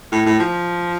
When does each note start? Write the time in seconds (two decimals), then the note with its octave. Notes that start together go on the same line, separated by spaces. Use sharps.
0.11 A2
0.26 A2
0.39 F3